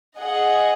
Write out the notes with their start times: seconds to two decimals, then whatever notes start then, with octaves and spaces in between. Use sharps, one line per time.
0.19 G#4 D#5 F#5